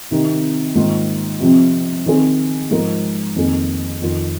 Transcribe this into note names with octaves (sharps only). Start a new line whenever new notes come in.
C3 D#3 C4 D#4
G#2 D#3 A#3 F4
C3 F3 C4
D#3 C4 G#4
G#2 F3 G#3 F4 A#4
F2 D#3 A#3 G#4
F2 D#3 C4 F4